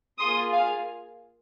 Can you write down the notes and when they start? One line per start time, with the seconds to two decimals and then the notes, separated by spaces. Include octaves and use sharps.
0.19 A#3 F4 G#4 C6 D#6
0.53 F5 G#5